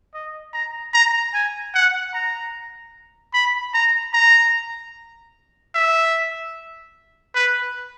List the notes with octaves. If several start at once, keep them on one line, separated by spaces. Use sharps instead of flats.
D#5
A#5
A#5
G#5
F#5
A#5
B5
A#5
A#5
E5
B4